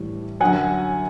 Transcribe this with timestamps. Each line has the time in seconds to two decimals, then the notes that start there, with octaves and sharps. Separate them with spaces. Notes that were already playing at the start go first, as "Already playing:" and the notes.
Already playing: A2 E3 G3
0.40 F#2 D3 F#3 F#5 G#5